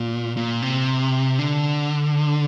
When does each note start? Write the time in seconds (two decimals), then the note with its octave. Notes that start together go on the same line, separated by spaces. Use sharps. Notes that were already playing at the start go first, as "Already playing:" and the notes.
Already playing: A#2
0.37 A#2
0.62 C3
1.39 D3